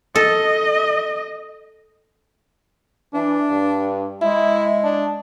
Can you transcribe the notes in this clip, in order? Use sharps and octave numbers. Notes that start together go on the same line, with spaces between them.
A4 D#5
E3 D4
G2
G#3 E4
D4